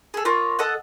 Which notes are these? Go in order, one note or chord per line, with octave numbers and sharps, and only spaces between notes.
G#4 A4
F4 A#4 C#5 D6
A4 D#5 F#5